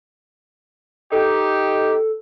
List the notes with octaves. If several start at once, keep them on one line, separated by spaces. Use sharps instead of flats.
D#4 G4 A4